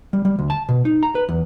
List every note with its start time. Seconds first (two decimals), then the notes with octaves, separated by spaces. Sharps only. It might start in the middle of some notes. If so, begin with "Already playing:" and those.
0.13 G3
0.25 G3
0.39 D2
0.50 A5
0.69 B2
0.85 D#4
1.03 A#5
1.15 B4
1.29 E2